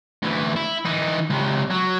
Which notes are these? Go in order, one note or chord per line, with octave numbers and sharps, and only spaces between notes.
D2 E3
E4
E3 D#4
C#2 C3
F#3